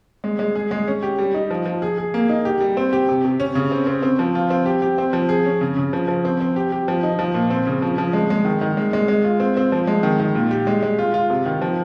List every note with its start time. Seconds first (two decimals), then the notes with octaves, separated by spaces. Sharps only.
0.24 G#3
0.39 G#3
0.55 G#4
0.71 G#3
0.88 C#4
1.03 G4
1.19 G3
1.34 D#4
1.51 F3
1.66 F3
1.82 G#4
1.98 G#4
2.14 A#3
2.29 D#4
2.45 G4
2.61 G3
2.77 C4
2.93 G4
3.08 C3
3.25 C3
3.40 C#4
3.55 C#3
3.71 C4
3.87 C4
4.02 C4
4.19 F3
4.35 F4
4.50 C4
4.66 G4
4.82 G4
4.98 C4
5.13 F3
5.29 G#4
5.45 C#4
5.61 C#3
5.77 C#3
5.93 F3
6.08 F3
6.25 C4
6.40 C4
6.56 G4
6.72 G4
6.88 F3
7.03 D#4
7.19 F3
7.34 A#2
7.50 C4
7.67 C#3
7.82 F3
7.98 F3
8.13 G#3
8.30 G#3
8.45 D#3
8.61 D#3
8.77 G#3
8.93 G#3
9.08 G#3
9.24 F4
9.40 C4
9.57 C4
9.72 F3
9.87 G#3
10.03 D#3
10.20 D#3
10.35 A#2
10.51 G4
10.67 G#3
10.83 G#3
10.99 F4
11.14 F4
11.30 C3
11.46 D#3
11.62 F3